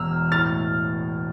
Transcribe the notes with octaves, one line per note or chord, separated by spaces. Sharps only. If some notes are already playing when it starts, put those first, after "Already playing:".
Already playing: E1 E2 A#5 E6 F6
A2 F6 A6